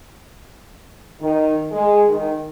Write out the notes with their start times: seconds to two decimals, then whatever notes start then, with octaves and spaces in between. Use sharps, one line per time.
1.20 D#3
1.71 G#3
2.08 D#3